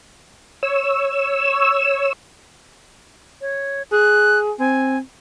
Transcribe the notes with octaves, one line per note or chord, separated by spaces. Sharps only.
C#5 E6
C#5
G#4 F#6
C4 G#5